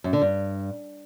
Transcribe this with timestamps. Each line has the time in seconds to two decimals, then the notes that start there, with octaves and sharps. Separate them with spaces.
0.04 F#2
0.13 D3
0.22 G2